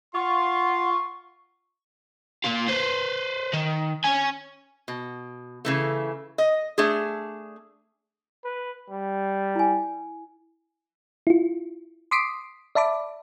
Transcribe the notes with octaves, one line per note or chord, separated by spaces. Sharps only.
F4 F#5 C6 C#6
A#3 F4
B4 C5
D#3
C#4 G#5
B2
C#3 E3 A3
D#5
A3 D4 G#4
B4
G3
E4 G#5
E4 F4
C6 D6 D#6 B6 C7 D7
D5 E5 A5 B5 D6